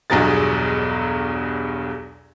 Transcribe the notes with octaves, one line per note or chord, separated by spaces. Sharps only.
B1 E2 G2 F#3 G#4 A6